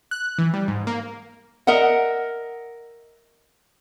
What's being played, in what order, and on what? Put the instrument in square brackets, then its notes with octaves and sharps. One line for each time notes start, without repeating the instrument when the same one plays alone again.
[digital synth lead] F#6
E3
G3
G#2
A#3
[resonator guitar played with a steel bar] A#4 D#5 E5 F#5